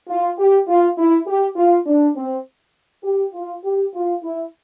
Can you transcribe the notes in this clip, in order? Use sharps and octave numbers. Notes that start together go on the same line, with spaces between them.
F4
G4
F4
E4
G4
F4
D4
C4
G4
F4
G4
F4
E4